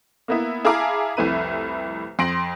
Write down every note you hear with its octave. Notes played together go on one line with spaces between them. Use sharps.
A#3 B3 E4
E4 G#4 F5 A5 A#5 D6
C2 F2 A3 E4 B4 D#7
F2 C6 A#6 D7 F#7